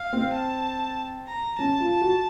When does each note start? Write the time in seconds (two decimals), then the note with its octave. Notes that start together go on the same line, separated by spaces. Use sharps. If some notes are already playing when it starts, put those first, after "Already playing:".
Already playing: F5
0.13 C4
0.34 A5
1.28 A#5
1.59 C#4 A5
1.80 F4
1.91 A5
2.01 F#4